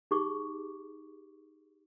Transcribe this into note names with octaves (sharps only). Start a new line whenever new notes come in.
D#4 G4 G#4 C#6 D6